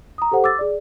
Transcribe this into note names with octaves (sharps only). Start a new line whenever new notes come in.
A#5 D#6
G4 A4 C5 F#5
D6 E6 A6
G#4 D5